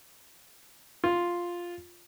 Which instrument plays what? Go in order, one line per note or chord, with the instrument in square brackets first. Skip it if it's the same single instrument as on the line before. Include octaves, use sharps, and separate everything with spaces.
[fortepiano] F4